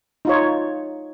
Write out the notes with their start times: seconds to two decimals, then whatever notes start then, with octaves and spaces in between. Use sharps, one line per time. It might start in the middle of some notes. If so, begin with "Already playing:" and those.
0.25 D#4 F4 C#5